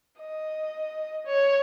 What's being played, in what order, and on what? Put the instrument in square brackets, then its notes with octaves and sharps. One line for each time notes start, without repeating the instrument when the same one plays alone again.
[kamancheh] D#5
C#5